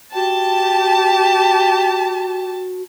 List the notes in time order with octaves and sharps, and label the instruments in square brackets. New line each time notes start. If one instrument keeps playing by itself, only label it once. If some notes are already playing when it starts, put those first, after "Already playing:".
[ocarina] F#4 [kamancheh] G4 [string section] A5